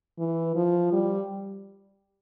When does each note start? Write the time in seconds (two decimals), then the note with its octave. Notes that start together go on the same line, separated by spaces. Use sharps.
0.19 E3
0.56 F3
0.93 G3